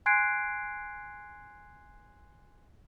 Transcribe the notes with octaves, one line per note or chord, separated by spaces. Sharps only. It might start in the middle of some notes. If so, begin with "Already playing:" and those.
G#5 C6 F#6 G#6 C7 D7